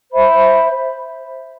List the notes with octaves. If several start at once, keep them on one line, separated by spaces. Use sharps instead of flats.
C5 E5 B5